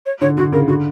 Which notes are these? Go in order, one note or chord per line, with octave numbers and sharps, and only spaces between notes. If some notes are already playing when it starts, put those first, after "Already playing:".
C#5
D3 C#5
D3 F#4
C#3 A#4
D3 F#4